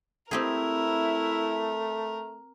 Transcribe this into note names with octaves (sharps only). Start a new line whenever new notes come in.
A3 C4 E4 G4 G#4 A#4